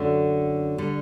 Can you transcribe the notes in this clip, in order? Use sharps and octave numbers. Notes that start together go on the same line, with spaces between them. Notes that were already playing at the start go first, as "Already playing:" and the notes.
Already playing: F#2 D3 A3 C#4 F#4
D3 G3